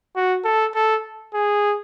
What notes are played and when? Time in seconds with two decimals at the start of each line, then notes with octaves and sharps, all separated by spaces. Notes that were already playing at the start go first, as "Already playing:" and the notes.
0.16 F#4
0.45 A4
0.75 A4
1.34 G#4